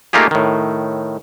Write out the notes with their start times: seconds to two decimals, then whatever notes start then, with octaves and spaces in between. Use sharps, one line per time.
0.13 A3 A#3 D#4 F4 G4 G#4
0.31 A2 D#3